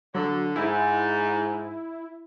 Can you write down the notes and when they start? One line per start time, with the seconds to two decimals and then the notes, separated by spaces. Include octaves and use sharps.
0.15 D3 F#3
0.56 G#2 E4